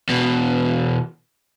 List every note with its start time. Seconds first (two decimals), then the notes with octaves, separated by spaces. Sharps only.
0.09 E2 B2